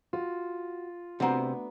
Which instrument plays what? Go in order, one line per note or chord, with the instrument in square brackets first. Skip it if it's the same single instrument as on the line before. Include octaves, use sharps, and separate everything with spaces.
[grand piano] F4 [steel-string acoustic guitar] F#4
[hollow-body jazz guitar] C3 C4 [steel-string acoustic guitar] A3 B3 D4 [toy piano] F#4 F#5 A#5